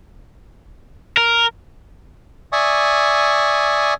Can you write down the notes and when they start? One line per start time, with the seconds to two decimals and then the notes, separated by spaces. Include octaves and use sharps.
1.17 A#4
2.52 D5 E5 G#5 C#6 D#6